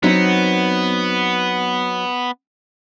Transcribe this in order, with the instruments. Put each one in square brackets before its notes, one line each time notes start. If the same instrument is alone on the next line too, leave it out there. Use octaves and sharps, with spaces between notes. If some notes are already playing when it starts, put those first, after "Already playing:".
[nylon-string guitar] F#3 C4 D#4 [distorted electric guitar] B3